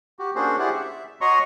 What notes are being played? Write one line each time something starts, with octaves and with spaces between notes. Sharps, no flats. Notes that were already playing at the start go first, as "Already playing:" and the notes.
F#4 G4
A#3 C#4 D4 F#4 G#4 C5
E4 G4 G#4 C5 D5 F#5
E5
F#4 C#5 D#5 A#5 C6 C#6